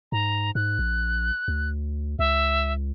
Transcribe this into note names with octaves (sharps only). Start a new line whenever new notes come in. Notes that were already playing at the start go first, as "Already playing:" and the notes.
G#2 A#5
G#2 F#6
A#1
D2
C#2 E5